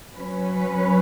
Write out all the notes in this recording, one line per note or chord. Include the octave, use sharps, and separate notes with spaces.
F#3 C#4 B4